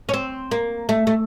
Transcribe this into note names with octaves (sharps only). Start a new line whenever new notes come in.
C#4
C4
A#3
A3
A3